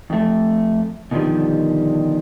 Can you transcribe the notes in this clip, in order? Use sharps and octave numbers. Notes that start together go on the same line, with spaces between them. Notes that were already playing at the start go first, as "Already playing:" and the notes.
F2 A3
B2 D3 D#3 F3 G3